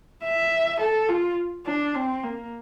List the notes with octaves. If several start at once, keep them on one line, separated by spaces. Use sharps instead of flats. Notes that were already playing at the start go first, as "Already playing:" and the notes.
E5
A4
F4
D4
C4
A#3